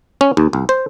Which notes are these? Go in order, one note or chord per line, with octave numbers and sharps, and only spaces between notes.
C#4
D#2
C2
C5